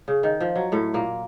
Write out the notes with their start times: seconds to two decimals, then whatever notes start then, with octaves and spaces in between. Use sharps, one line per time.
0.08 C#3
0.23 D#3
0.40 F3
0.56 F#3
0.72 A2 A3
0.94 A#2 A#3